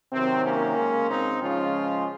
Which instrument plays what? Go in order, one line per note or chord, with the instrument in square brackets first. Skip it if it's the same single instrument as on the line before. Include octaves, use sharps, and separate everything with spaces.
[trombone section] C3 D#3 F#3 C4
A#3 C#4
C#3 G#3
C4 D#4
C#3 F3 G#3 C#4 F4